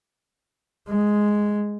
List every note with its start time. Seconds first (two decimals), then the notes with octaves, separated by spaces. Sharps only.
0.89 G#3